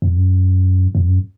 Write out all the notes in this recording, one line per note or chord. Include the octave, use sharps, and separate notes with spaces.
F2
F#2
F2
F#2